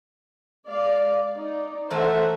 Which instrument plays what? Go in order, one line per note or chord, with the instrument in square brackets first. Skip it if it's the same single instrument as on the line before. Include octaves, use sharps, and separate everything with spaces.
[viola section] G#3 D5 F5
D#4 D5
[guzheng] E3 A3 A#4 [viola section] C5 E5 F#5